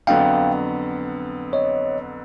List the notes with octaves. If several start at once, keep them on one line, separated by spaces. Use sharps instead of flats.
F2 D3 F#3 B3 F5 G5
C#5 D#5